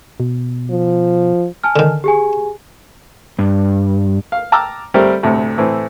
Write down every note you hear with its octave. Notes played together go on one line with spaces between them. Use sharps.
B2
F3
G#5 A5 F6
D3 D#3
G4 G#4 G#5
G2
F5
G5 A5 A#5 D6 E6 F6
G3 A3 C4 G4 A#4
D2 A2 C3
A2 E3 C4